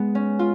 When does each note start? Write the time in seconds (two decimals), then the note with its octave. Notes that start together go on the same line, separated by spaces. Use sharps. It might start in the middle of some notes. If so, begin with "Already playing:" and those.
Already playing: G#3 B3
0.15 C#4
0.39 F4